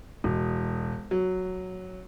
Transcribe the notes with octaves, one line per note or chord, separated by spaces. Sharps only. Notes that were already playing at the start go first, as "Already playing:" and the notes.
E1
F#3